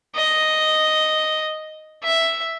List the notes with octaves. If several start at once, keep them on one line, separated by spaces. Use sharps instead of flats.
D#5
E5